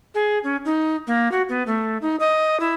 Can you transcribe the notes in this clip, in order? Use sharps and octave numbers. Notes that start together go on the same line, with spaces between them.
G#4
C#4
D#4
A#3
F#4
B3
A3
D#4
D#5
E4